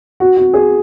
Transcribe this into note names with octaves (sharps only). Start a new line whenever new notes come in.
F#4
F#4
G#4